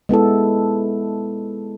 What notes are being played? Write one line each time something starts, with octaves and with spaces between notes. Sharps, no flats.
G#3 B3 E4 A4